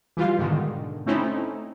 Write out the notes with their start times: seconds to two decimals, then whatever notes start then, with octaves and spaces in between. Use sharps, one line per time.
0.17 E3 G3 F4 F5
0.39 G#2 B2 D3 D#3
1.07 A3 C4 C#4 D#4 E4